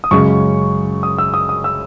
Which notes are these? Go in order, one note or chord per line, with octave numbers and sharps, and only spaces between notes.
D#6
F#2 C#3 G#3 C#6
D#6
E6
D#6
D#6
E6